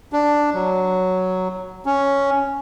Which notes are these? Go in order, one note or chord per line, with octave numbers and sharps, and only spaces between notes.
D4
F#3
C#4